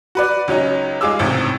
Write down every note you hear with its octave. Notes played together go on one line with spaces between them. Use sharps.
F#4 B4 D5
C#2 F#3 C#4 D#4
G#3 F4 G#4 D6 E6
G#1 C#2 A2 C3